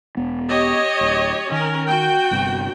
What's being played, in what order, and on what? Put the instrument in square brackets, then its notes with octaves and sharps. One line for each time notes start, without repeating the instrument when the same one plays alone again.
[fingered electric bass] E1 B3
[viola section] G4 C#5 D#5
[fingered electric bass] D1
[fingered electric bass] D#3 [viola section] C#4 A#4
[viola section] F#4 G5
[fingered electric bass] G1 G2 C3